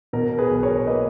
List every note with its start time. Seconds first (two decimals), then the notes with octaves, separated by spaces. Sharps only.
0.13 B2 A#4
0.38 G#4 B4
0.51 B1
0.63 A#4 C#5
0.87 A#3 B4 D#5